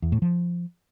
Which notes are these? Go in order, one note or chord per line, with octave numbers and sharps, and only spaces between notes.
E2
A2
F3